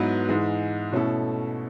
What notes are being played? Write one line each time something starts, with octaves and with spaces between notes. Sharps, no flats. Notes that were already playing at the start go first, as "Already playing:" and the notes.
Already playing: G#2 F#3 B3 E4 B4
G#2 E3 G#3
B2 A3 C#4 E4 A4